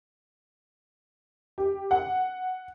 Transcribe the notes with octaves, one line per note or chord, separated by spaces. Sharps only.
G4
F#5